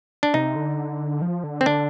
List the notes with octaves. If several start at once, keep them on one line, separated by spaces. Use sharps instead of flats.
D4
C3 D#4
D3
F3
D3
C4
D3 D4